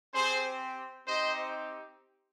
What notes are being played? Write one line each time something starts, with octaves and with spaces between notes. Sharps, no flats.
C4 G4 G#4 C5
C4 D#4 G4 C5 D#5